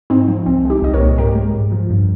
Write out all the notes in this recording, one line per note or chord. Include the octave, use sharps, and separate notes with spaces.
G#2 C4 D#4
F3
C2 C4
G#3
D#4 G4
C2 D#5
A#4 C#5
A#2
G#2 G4 A#4
G#3
G#2
F3
G2